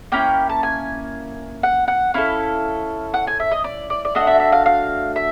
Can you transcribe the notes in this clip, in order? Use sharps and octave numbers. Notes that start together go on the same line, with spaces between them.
A#3 C#4 E4 G5
A5
G#5
F#5
F#5
C#4 E4 A4 F5
F#5
G#5
E5
D#5
D5
D5
D5
A3 D4 F#4 D#5
E5
E5
F5
F5
E5